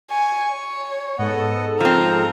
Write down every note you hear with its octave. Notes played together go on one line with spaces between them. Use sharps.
G#5 C#6
C#5
G#2 B3 A4 D#5 F#5
F3 C4 A#4 A#5